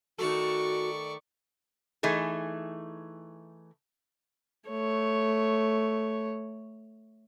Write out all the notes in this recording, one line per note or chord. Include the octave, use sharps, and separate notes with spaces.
D#3 A3 F#4 A4 D5 C#6
E3 A3 D#4 G#4
A3 C#5